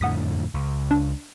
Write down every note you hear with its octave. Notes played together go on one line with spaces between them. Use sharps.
F2 A2 D3 F#5 D#6 B6
C#2
D4